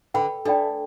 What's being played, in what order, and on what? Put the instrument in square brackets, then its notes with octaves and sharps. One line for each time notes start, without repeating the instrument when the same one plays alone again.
[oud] D3 [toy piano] B4 G5 B5
[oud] A3 [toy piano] D4 A4 D5 G5 B5